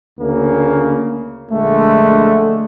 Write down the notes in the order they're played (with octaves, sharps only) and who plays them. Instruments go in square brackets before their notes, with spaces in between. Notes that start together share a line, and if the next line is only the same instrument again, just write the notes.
[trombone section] D2 C#3 A#3
[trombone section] A#1 D3 G#3 [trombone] A3